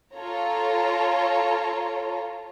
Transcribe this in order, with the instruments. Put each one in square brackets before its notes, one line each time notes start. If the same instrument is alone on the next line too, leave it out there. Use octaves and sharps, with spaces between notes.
[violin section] F4 A4 C#5 A#5